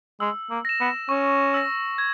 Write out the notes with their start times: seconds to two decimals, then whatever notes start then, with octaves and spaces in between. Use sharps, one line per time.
0.20 G#3 E6
0.50 A#3
0.65 A#6 E7
0.80 B3
1.09 C#4 C#6
1.54 E6 A#6
1.98 G#6